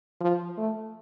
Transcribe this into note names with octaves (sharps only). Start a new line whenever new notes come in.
F3
A3